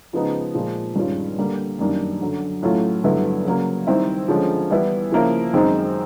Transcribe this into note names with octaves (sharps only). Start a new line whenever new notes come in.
C#3 F3 G#3 B3 D#4
A#2 F3 G#3
G2 D#3 G#3 C#4 F4
D3 G3 A#3
F#2 D#3 G3 A#3 D4
F#2 D3 F#3
A2 F#3 A3 C#4 F4
G2 D3 F#3 B3 E4
C#3 F#3 A#3
D#3 G3 C4 E4
D3 F3 G#3 C#4
E3 G3 B3 E4
C#3 F3 A#3 C#4 E4
F#2 D#3 G#3 C4 D#4